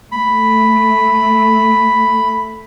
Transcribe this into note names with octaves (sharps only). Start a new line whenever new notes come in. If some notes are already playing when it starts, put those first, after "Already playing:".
A3 B5